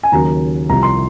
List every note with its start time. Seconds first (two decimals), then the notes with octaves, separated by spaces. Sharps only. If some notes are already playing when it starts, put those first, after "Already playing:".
0.03 G#5
0.12 D#2 C#3 F#3 A#3 A#5
0.69 C2 C3 F3 A#5
0.83 C6